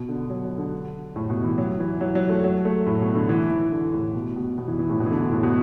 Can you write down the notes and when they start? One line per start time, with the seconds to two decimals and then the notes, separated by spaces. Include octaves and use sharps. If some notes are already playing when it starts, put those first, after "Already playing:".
Already playing: B2
0.09 D3
0.30 F#3
0.44 F#3
0.58 D3
1.16 A2
1.30 B2
1.44 E3
1.58 F#3
1.80 E3
2.01 F#3
2.15 F#3
2.29 A3
2.44 F#3
2.65 A3
2.86 A2
3.01 B2
3.15 D3
3.29 E3
3.50 E3
3.72 D3
3.93 A2
4.15 B2
4.36 B2
4.58 B2
4.68 E3
4.79 E3
4.90 A2
5.00 B2
5.06 E3
5.11 D3
5.21 B2
5.32 A2
5.43 B2